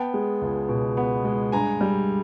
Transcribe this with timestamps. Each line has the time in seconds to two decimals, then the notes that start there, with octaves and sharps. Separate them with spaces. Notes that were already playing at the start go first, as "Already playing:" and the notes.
Already playing: B3 G5 A5
0.14 G#3
0.41 C#2
0.69 B2
0.97 B3
1.24 G#3
1.52 G2 G#5 A#5
1.81 G3